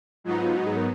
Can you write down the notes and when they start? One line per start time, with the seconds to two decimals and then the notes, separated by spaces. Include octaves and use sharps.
0.24 G#2 F#3 B3 D#4 F4
0.40 F4
0.57 F#4
0.67 G#4
0.77 A#4